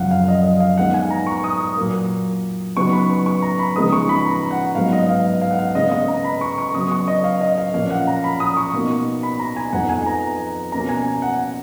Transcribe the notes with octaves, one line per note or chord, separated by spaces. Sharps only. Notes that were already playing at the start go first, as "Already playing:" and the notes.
Already playing: F#2 C#3 F3 F5 F#5
F5
D#5
D#5
F5
D#3 G#3 B3 D#4 F#5
G#5
A#5
C#6
D#6
D#6
A#2 F#3 A#3
C#3 F#3 B3 D#4 C#6
B5
C#6
C#6
A#5
B5
C#3 F3 G#3 B3 D#4 D#6
C#6
B5
A#5
F#5
G#2 F#3 B3 D#4 F5
D#5
F5
F5
F#5
F5
C#3 G#3 B3 D#5
D#5
A#5
B5
C#6
C#6
C#3 F#3 B3 D#6
C#6
D#5
F5
D#5
F5
A#2 F3 A#3 C#4 F5
F#5
A#5
B5
D#6
C#6
B2 A#3 D#4
B5
A#5
G#5
F2 F3 B3 D#4 F#5
G#5
A#5
B2 A#3 C#4 A#5
G#5
F#5